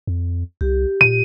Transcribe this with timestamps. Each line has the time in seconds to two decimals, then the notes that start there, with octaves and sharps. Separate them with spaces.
0.07 F2
0.61 C2 G4
1.01 A#2 D#7